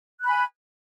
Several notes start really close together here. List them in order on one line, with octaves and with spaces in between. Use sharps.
F#6 B5 G#5